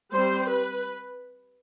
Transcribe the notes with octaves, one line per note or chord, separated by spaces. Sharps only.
G3 C4 C5
B4